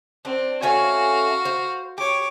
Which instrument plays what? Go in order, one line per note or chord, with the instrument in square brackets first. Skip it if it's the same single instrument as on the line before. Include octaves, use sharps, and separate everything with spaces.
[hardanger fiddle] C4 [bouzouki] D4
[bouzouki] A3 C#4 G#5 [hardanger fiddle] F#4 F5
[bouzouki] C5
[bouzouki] G4 [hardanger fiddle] C#5 D6